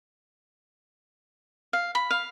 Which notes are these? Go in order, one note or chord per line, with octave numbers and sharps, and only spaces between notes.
F5
B5
F5